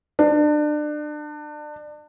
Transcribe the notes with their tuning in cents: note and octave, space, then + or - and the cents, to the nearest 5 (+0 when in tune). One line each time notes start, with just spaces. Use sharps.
D4 +30